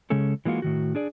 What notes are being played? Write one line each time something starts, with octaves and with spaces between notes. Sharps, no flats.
C#3 G#3 C#4 G#4 A4
E3 G#3 A#3 F4 F#4
A2 D#3 F#4
D4 G#4 D5